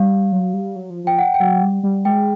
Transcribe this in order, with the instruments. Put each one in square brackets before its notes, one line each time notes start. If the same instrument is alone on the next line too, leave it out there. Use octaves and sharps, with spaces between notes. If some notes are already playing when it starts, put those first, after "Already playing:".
Already playing: [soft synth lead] G3 [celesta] F5
[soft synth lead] F#3
G3
F#3
F3
[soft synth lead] F3 [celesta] G5
[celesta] F#5
G5
[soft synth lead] F#3 [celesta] F#5
[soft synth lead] G3
G3
[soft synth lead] G#3 [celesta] G5